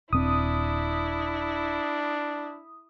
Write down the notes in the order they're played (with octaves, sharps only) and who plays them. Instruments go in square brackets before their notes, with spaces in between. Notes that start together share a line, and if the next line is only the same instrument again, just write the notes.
[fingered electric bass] D#1 C4 [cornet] D4 [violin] E4 [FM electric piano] D#6